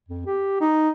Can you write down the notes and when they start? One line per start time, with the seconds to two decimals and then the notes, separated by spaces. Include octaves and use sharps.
0.09 F2
0.26 G4
0.61 D#4